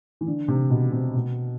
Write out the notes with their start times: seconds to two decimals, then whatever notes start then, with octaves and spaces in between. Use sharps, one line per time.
0.21 E3
0.27 D3
0.48 C3
0.70 B2
0.92 C3
1.15 B2